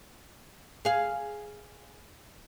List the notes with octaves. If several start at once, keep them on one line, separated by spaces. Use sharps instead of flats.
G#4 F5